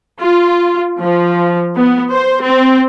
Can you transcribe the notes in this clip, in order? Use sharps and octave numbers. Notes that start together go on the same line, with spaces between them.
F4
F3
B3
C5
C4